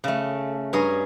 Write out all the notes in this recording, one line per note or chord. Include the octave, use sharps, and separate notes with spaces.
C#3 A3
G2 C#4 G#4 C#5 A#5